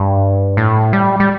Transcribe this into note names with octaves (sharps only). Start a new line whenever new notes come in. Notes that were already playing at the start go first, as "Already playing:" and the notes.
Already playing: G2
A2
G3
G3